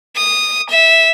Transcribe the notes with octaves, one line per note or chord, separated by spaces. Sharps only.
D#6
E5